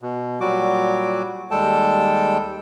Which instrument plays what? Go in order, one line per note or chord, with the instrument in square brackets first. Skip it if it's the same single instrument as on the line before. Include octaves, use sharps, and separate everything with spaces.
[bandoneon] B2
A#2 F#3 G3 F#4 D6
D#2 G3 G#3 A4 G5 A5